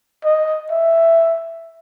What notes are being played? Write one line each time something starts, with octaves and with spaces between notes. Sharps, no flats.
D#5
E5